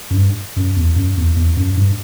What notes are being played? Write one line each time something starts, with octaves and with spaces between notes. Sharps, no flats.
F#2
G2
F#2
E2
F#2
E2
E2
F#2
G2